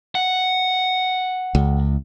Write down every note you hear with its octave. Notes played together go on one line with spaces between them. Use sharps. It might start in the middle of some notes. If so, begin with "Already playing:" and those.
F#5
C#2